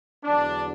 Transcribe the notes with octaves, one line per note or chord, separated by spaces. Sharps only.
E2 D3 F#3 D4